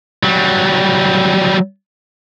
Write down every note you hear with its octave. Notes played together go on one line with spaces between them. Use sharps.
F#3 G3